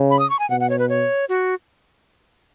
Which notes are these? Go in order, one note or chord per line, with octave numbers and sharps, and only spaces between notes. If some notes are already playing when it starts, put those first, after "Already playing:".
Already playing: C#3
B5
D#6
C#6
G#5
B2 F#5
F#5
C#5
B4
C#5
F#4